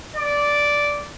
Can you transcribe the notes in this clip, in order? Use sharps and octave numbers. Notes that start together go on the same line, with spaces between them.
D5